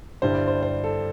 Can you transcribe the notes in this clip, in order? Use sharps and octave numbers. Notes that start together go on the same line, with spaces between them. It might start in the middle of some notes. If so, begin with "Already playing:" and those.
G2 D3 G3 E4 C5
D5
C5
C5
A4